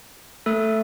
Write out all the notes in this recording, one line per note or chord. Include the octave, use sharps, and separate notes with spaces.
A3 A4